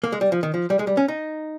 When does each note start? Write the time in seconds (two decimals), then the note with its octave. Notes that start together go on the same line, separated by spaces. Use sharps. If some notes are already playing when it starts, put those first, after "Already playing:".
0.04 A#3
0.12 G#3
0.21 G3
0.32 F3
0.43 D#3
0.54 F3
0.70 G3
0.79 G#3
0.87 G3
0.97 C#4
1.08 D#4